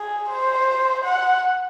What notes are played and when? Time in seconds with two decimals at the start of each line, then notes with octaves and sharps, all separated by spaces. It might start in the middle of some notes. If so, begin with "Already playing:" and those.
Already playing: G#4
0.30 C5
1.05 F#5